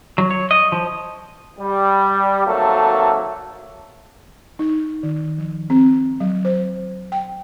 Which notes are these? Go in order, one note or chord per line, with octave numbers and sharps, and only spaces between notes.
F#3
C#5
D#5
F3
G3
G#1 F#3 A3 A#3 A4
D#4
D#3
F3
C4
F#3
C5
G5